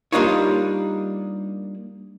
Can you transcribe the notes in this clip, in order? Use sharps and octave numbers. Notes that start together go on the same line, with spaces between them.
G3 A#3 D4 D#4 F4 C#5